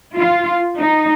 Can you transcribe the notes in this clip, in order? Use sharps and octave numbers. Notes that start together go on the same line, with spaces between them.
F4
D#4